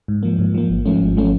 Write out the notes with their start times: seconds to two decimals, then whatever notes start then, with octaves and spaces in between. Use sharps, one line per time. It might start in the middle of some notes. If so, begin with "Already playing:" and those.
0.08 G#2
0.23 F3 A#3
0.39 G#2
0.54 F3 A#3
0.69 G#1
0.85 G#2 F3 A3 C#4
1.01 G#1
1.17 F3 A3 C#4